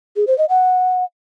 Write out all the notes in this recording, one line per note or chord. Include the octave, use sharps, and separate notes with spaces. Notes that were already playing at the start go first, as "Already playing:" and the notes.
G#4
C5
D#5
F#5